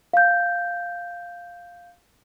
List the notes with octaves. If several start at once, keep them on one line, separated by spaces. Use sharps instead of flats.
F5 G6